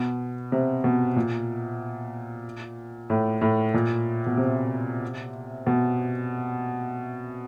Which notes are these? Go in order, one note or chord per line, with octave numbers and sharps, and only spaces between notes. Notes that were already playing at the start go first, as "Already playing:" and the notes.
Already playing: B2
C3
B2
A#2
A2
A2
A#2
B2
C3
B2